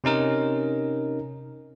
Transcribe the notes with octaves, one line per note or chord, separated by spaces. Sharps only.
C3 C#4 D#4 A#4